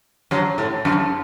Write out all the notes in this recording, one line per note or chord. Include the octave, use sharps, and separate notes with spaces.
F#2 F#3
A2
F#2